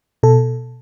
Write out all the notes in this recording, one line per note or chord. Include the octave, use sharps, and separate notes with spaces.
B2 A4